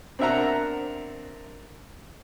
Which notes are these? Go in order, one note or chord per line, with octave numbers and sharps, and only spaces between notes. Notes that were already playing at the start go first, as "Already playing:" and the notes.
C4 D4 A#4 E5 F#5 A#5